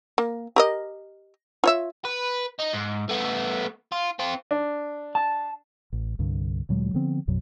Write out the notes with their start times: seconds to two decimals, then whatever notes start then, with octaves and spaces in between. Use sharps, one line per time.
0.18 A#3
0.56 G4 A#4 D#5
1.64 F4 C#5 E5
2.05 B4
2.59 D#4
2.73 G#2
3.09 A3 B3
3.92 F4
4.19 C4 F4
4.51 D4
5.15 A5
5.93 A1
6.19 C2 G2 D3
6.69 D2 A#2 F#3 G#3
6.94 D3 F3 B3 C4
7.27 A#1 F2 B2 F#3